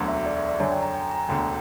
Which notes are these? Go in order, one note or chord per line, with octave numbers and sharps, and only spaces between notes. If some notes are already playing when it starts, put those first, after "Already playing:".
Already playing: E1 D2 D3 F#3
E5
D5
E5
D5
F#2 D3 F#3 C#5
G5
A#5
G5
A#5
E1 D2 D3 G5